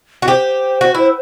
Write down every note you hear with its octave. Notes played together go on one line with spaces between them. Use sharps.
F#4
G4 C5
F#4
E4